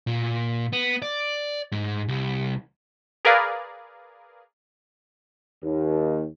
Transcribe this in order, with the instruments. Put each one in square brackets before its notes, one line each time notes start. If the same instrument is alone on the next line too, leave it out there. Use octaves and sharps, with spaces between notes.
[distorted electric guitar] A#2
B3
D5
G#2
C2
[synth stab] G#4 A#4 B4 D5 F5
[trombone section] D#2